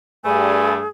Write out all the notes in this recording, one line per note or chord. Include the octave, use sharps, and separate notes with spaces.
G2 A3 G#4 D5 G#5 B5